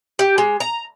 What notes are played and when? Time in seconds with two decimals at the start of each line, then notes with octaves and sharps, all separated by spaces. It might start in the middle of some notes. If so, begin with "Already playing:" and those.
0.19 G4
0.38 G#3
0.60 A#5